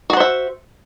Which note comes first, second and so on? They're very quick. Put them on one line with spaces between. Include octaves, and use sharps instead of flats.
F#4 F#5 C5 E5